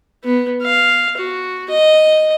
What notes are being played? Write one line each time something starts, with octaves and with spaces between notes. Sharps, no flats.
B3
F5
F#4
D#5